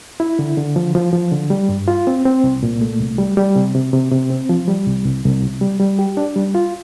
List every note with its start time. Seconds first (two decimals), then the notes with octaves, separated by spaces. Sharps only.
0.20 E4
0.39 D3
0.57 D3
0.76 F3
0.95 F3
1.13 F3
1.31 D3
1.50 G3
1.69 G2
1.88 F4
2.07 C4
2.25 C4
2.44 C2
2.63 A#2
2.81 A3
3.00 C2
3.18 G3
3.37 G3
3.56 C3
3.75 C3
3.93 C3
4.12 C3
4.30 C4
4.49 F3
4.68 G3
4.87 C2
5.05 C2
5.24 C2
5.43 C3
5.61 G3
5.80 G3
5.99 G4
6.17 D4
6.36 G3
6.55 F4